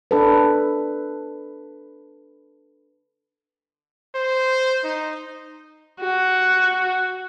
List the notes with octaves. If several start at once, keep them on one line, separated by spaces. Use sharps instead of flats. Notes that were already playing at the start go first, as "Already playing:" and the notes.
D4 A4 B4
C5
D#4
F#4